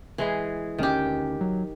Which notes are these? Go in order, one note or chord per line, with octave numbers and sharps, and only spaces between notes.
E3 G#3 G#4
D2 D#3 G#3 C#4 G4
F#3